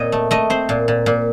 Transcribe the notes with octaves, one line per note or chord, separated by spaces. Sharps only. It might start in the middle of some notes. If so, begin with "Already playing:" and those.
Already playing: A#2 C4 C#5 D#5
A3
A3 D#5
C4 C5
A#2
A#2
A#2